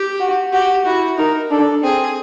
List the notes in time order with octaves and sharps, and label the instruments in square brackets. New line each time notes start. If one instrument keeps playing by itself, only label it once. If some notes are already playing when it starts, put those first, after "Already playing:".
Already playing: [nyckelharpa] G4
[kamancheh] F#4
[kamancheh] F#4 [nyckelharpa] G4
[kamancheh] E4 [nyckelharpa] F#4
[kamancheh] D#4 [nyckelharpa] A#4
[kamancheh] D4 [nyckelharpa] A4
[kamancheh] C4 [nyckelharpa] G#4